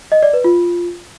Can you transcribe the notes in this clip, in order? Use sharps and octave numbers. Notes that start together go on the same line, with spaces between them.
D#5
D5
B4
F4